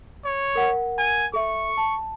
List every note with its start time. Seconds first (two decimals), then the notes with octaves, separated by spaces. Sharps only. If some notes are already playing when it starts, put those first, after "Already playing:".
0.25 C#5
0.55 A#4 F#5
0.98 G#5
1.34 A4 E5 C#6
1.77 A5